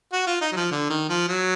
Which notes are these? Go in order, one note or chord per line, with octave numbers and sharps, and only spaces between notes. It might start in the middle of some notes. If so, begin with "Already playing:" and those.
F#4
F4
D#4
F#3
F3
D3
D#3
F3
F#3